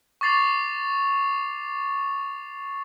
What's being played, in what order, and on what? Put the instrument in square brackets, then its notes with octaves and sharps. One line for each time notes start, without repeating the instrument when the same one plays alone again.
[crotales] C#6 D6 A6 C7 F7